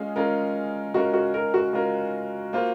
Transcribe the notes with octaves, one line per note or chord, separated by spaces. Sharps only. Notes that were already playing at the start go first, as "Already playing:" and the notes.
Already playing: G#3 C#4 F4 G#4
G#3 C#4 F4 A#4
G#3 C#4 F4 F#4 A#4
F#4
A#4
F#4
G#3 C#4 F4 A#4
A#3 F4 C5